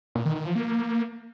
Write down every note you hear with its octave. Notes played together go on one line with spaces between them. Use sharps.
A#2
D#3
D#3
F3
A#3